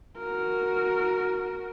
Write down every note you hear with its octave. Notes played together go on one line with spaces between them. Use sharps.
F#4 A#4